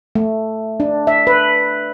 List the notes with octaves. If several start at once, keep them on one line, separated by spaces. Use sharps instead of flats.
A3
D4
E5
B4